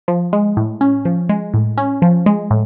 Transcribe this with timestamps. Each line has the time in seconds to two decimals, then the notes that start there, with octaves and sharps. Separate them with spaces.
0.08 F3
0.33 G#3
0.57 A2
0.81 C#4
1.05 F3
1.29 G#3
1.54 A2
1.78 C#4
2.02 F3
2.26 G#3
2.51 A2